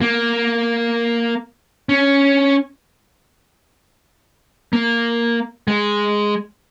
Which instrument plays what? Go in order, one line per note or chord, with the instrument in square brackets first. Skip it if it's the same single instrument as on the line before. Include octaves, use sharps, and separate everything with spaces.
[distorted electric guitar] A#3
C#4
A#3
G#3